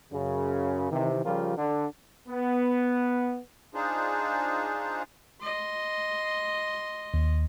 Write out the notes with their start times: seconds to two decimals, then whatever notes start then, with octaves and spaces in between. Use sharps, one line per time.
0.12 F#2 C#3
0.92 C3 D#3 E3
1.24 C#3 F3 G3 F4 G4 A#4
1.58 D3
2.29 B3
3.74 D4 D#4 F4 G#4 C5
5.42 D#5 C6
7.14 D#2